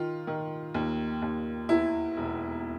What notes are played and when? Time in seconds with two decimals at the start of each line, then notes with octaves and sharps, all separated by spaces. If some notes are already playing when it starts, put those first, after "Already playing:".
Already playing: D#3 F4
0.27 D#3
0.74 D#2
1.22 D#2
1.69 E2 E4
2.17 E1